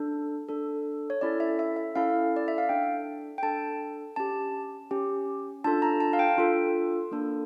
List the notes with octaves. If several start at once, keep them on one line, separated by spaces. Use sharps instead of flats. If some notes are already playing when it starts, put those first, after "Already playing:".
Already playing: D4 A4
D4 A4
C#5
C#4 E4 A4 D5
E5
E5
E5
C#4 E4 A4 F5
D5
E5
F5
D4 A4 G5
G5
D4 A4 A5
C#4 G4 A5
C#4 G4
D4 F4 A4 A5
A#5
A5
F5
G5
D4 F4 A4
A#3 D4 A4